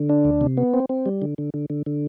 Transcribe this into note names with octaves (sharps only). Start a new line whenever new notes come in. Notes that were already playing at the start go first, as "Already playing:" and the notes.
Already playing: D3
D4
D2
C3
B3
C4
C4
G3
D3
D3
D3
D3
D3